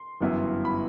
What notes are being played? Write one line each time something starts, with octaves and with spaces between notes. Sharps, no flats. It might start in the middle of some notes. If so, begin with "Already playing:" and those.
Already playing: C6
G1 F#2 E3 B3 E4
B5